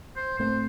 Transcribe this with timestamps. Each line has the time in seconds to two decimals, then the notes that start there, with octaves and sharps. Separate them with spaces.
0.16 C5
0.39 A2 A3 C4 C5